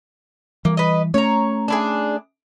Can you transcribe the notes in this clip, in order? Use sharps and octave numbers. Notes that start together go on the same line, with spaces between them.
E3 G3 A#3
B4 D#5
A3 C#4 C#5 A#5
D4 E4 G#4